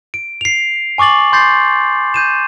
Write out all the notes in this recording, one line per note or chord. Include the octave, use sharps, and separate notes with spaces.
D7
C7 F7
G#5 C#6 D6 A6 F#7
C6 G6 A6 C7
G6 D#7 E7